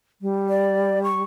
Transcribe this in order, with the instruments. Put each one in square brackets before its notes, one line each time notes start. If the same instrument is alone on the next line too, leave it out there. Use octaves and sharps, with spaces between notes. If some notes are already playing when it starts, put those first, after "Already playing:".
[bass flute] G3
[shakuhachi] D5
C#6